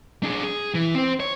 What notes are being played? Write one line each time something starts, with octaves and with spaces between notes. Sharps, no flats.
D4 G#4
G#4
E3
C4 C5
C#5